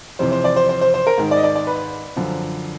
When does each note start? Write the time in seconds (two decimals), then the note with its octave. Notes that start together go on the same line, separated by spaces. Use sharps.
0.19 F2 C3 E3 C5
0.32 C5
0.44 D5
0.56 C5
0.69 C5
0.81 C5
0.94 C5
1.07 A#4
1.18 G#2 D#3
1.31 D5
1.37 D#5
1.44 D5
1.55 D5
1.67 B4
2.16 F#2 D3 F3